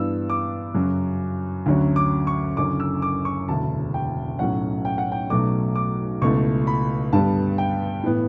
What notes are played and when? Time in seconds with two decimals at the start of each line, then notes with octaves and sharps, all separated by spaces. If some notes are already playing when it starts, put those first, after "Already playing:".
Already playing: G2 E3 B3 D4 E6
0.30 D6
0.74 F#2 C#3 F#3
1.66 D2 D3 F#3 C#4
1.96 D6
2.27 C#6
2.57 F#1 F#2 D3 F#3 C#4 D6
2.80 E6
3.02 D6
3.25 C#6
3.48 E1 D2 C#3 A5
3.94 G5
4.39 B1 A2 F#3 C#4 F#5
4.85 G5
4.98 F#5
5.12 G5
5.30 B1 B2 F#3 A3 D6
5.75 D6
6.22 C#2 B2 A3 E4 C#6
6.67 B5
7.13 G2 D3 G3 B3 A5
7.58 G5
8.03 A2 E3 B3